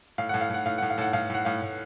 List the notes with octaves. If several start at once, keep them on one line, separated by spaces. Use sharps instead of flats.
A2 F5
A2 F#5
F5
A2 F#5
A2 F5
A2 F#5
F5
A2 F#5
A2 F5
A2 F#5
A2 F5
A2